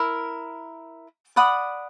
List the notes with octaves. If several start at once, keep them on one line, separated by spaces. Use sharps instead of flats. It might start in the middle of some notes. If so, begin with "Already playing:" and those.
Already playing: E4 A#4
D5 F#5 B5 D#6